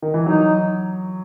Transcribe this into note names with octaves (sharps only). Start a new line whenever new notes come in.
D#3
E3
F#3 D#4